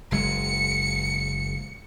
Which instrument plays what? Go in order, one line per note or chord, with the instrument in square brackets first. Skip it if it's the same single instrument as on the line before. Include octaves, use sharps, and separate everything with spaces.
[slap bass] F#1 G#3 [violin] C#7